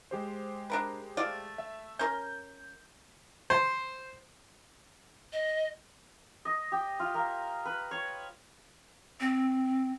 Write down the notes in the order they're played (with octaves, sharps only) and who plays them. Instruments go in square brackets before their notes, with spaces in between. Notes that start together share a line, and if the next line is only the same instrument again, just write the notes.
[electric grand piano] G#3 G4 C5
[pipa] D4 A#4 B4
A3 F4 D5
[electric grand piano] E5
[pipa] C#4 A#4 [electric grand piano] G6
[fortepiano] C5
[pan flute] D#5
[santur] D#5
G4
F4
A#3
B4
C#5
[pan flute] C4